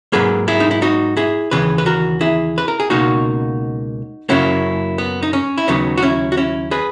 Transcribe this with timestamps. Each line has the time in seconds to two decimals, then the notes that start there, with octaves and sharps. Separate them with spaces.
0.12 G#2 F#3 A#3 G#4 B4
0.48 E4 G#4
0.60 D#4
0.71 E4
0.82 D#4 F#4
1.17 E4 G#4
1.51 D#2 C#3 E3 G#4 B4
1.78 B4
1.86 F#4 A#4
2.21 E4 G#4
2.58 B4
2.68 A#4
2.80 G#4
2.90 C#2 B2 A#3 D#4 F#4
4.29 F#2 C#3 F#3 A#3 C#4 E4
4.98 B3
5.23 D#4
5.33 C#4
5.58 E4
5.68 D#2 C#3 F#3 B3 D#4
5.98 F#4
6.02 C#4 E4
6.32 F#4
6.37 C#4 E4
6.71 G#4 B4